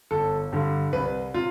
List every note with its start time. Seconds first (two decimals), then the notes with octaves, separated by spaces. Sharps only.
0.11 G1 A4
0.53 G2 D3
0.93 C2 B4
1.34 C3 F4